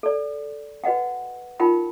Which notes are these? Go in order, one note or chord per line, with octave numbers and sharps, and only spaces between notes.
A4 D5
F#4 B4 D#5 F#5 G5
D#4 F4 A#4 G5 B5